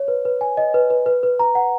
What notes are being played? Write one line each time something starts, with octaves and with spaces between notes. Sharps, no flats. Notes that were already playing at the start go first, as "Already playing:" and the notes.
Already playing: C#5
B4
B4
G#5
D#5
B4
B4
B4
B4
A#5
F#5